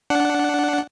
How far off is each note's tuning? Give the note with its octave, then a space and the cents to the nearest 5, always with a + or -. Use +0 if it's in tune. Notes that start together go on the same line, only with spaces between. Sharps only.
D4 -10 F#5 +0